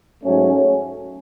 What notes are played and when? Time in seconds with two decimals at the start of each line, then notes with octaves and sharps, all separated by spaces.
0.22 G#2 F#3 A3 C#4